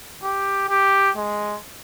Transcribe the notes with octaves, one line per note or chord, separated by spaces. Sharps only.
G4
G4
G#3